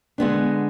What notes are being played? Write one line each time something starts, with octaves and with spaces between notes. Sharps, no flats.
D3 G#3 B3 D4